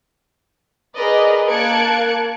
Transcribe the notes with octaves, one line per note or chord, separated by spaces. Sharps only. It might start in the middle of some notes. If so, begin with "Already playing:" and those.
G#4 A#4 B4 D5 D#5
A#3 A5 F#6 G#6 C#7 D7